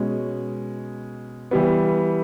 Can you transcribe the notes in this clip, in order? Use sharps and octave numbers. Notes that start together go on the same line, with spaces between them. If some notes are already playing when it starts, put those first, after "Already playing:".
Already playing: B2 G#3 C#4
E3 G3 B3